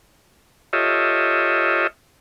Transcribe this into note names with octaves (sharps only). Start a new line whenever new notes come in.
F4 G4 A4 C#5 D#5 E5